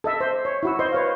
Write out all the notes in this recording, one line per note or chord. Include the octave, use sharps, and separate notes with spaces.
A4 D#5 E5
C5 E5
C#5
E4 F#4 E6
C5 D#5 C6
B4 C#5 F5